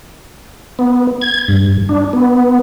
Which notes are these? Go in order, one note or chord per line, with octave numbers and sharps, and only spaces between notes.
B3
G#6
G2
D4
B3